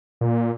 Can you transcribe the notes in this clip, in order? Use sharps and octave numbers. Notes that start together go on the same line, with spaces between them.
A#2